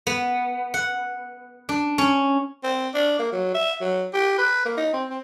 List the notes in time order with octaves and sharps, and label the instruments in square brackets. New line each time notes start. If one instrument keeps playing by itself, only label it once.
[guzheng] B3
F#5
D4
C#4
[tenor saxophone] C4
D4
A#3
F#3
E5
F#3
G4
B4
A#3
D#4
C4
C4